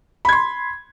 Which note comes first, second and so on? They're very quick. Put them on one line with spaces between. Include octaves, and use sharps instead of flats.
B5 G#6 C6